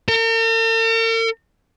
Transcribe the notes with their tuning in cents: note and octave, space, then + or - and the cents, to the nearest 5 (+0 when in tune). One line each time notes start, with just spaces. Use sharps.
A#4 -45